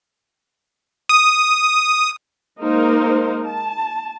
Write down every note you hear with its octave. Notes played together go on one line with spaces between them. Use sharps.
D#6
G#3 A#3 D#4 A#4 C5
A5